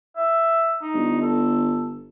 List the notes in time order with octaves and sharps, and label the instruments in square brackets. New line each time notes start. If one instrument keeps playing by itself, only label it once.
[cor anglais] E5
D#4
[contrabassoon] G1
[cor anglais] A4